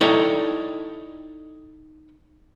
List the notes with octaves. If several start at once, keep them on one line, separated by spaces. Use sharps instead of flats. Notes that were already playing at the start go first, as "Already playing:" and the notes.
D#4 E4 A4 C#5 D5 G5